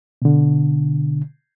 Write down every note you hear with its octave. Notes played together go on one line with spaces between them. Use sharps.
B2 D3